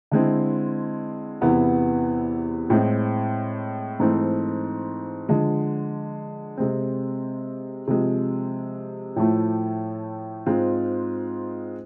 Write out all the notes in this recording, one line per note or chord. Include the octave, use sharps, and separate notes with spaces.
D3 G#3 C4 E4
E2 C3 E3 B3 E4
A2 G#3 C4
G#2 E3 A3 C4
D3 F3 G#3
C3 G#3 C4
C3 F3 G#3
A2 F3 A3 E4
G#2 G#3 C4 F4